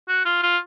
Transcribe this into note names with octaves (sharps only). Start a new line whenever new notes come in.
F#4
F4
F4